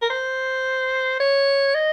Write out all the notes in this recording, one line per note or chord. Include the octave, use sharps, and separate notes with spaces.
A#4
C5
C#5
D#5